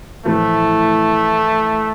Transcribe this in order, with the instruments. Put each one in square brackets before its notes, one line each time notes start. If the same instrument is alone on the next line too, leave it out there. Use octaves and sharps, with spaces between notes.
[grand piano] A2 E3 F3 [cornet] A3